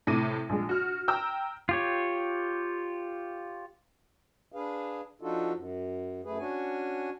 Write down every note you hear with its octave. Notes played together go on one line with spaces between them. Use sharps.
A2 C3 D6 A#6 D#7
A#1 G#3
F#4 F6
G5 A#5 E6
F4 G4 C#5
D4 G#4 B4 F5
F3 D4 D#4 F4 F#4 A4
F#2
F#2 A3 G#4 B4
C#4 D4 F#4 G#5